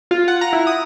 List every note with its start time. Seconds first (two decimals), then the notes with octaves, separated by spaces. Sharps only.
0.11 F4
0.28 F#5
0.41 A#5
0.53 E4
0.67 D#6